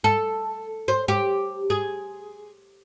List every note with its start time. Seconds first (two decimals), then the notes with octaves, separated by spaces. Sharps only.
0.04 A4
0.88 C5
1.08 G4
1.70 G#4